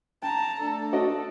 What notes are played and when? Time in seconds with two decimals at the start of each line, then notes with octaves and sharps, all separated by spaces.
0.22 G5 A5 A#5
0.61 A3 D4 A4
0.93 F#4 D5 D#5